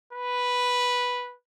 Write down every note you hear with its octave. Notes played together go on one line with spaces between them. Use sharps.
B4